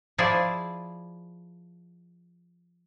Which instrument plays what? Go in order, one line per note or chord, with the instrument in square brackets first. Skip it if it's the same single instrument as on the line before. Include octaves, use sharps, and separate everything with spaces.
[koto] F3 E4 G#4 D5